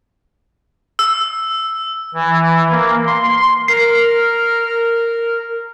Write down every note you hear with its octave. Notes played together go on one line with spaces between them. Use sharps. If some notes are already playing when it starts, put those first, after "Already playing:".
E6
E3
A#3
C6
A#4 C7